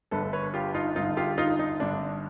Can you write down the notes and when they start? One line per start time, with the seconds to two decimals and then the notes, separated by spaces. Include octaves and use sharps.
0.11 G1 G2 D3 A4 B4
0.33 B4 C#5
0.54 F4 G4
0.74 D#4 F4
0.96 G1 G2 D3 D#4 F4
1.17 F4 G4
1.38 D#4 F4
1.59 D#4
1.80 G1 G2 D3 D4